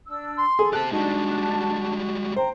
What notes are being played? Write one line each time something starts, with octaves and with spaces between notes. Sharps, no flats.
D4 E6
C6
G#4 A4
G4 C5 A5 F#6
G3 G#3 D4 D#4 F#4 A5
C5 G5 A#5